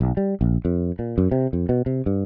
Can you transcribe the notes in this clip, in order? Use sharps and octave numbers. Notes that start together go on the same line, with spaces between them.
B1
G3
A#1
F2
A#2
F#2
C3
F2
B2
C3
G2